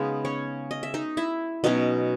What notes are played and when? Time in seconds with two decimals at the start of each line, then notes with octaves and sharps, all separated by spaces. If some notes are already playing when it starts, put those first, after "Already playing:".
Already playing: C#3 G#3 B3 D#4 B4 D#5
0.25 C#4 C#5
0.71 D#5
0.83 E5
0.94 D#4 D#5
1.17 E4 E5
1.64 B2 F#3 C#4 D#4 D#5